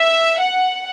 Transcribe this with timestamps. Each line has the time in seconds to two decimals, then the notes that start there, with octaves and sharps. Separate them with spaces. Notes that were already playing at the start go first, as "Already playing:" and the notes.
Already playing: E5
0.40 F#5